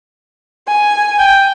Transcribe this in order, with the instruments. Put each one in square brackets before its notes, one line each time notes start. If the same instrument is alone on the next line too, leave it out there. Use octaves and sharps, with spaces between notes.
[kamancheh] G#5
[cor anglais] G5